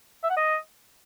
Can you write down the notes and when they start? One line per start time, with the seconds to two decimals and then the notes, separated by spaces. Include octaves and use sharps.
0.23 E5
0.30 F#5
0.37 D#5